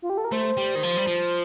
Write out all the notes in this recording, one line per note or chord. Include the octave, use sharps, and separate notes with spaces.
F4
G4
A4
A#4
A3 C5
G3
D#3
F3
G3
F3